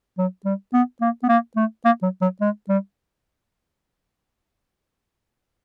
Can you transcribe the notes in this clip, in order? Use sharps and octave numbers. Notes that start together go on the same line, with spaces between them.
F#3
G3
B3
A#3
B3
A#3
A3
A#3
F#3
F#3
G#3
G3